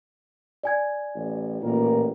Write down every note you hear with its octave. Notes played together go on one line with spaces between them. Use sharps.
D5 G#5 G#6
A1
A1 A#2 A#4